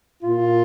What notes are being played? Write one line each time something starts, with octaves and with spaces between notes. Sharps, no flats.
A#2 F4